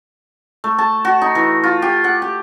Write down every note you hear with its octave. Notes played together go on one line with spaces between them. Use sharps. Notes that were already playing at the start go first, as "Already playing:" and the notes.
A3
A5
F#4
D#4
E3
F4
G4
F#5
G4